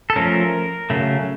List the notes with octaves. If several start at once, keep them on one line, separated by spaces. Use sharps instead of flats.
A4
F3 A3 C#4 A#4
C#3 F#3 A3